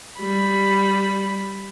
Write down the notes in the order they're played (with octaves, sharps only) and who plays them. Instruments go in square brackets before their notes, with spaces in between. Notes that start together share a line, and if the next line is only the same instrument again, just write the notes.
[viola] G3 B5